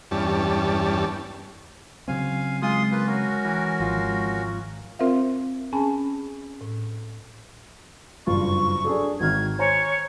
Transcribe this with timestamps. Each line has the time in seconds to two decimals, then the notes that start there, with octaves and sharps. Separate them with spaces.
0.11 E2 G2 G3 C#4 A5
2.08 C#3 F#3 C4 F5 G#5
2.62 G#3 F4 C6 D#6
2.91 A#3 F4 B4
3.07 C#4 F#4 A#4
3.44 E3
3.80 G#1 F3 F4
4.99 C4 F4 A#4 C5 E5 F5
5.73 C#4 G#4 G#5 A5 B5 C#6
6.61 A2
8.27 F#1 G2 F4 C#6
8.85 D4 G#4 A4
9.20 G#1 D#3 F6 G#6
9.59 C5 C#5 G#5 A#5